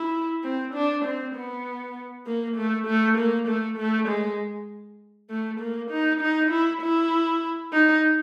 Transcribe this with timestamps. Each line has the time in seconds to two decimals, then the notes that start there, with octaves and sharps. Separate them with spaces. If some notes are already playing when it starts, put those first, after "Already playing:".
Already playing: E4
0.44 C4
0.75 D4
1.05 C4
1.35 B3
2.26 A#3
2.57 A3
2.87 A3
3.18 A#3
3.48 A3
3.78 A3
4.09 G#3
5.30 A3
5.60 A#3
5.91 D#4
6.21 D#4
6.51 E4
6.82 E4
7.73 D#4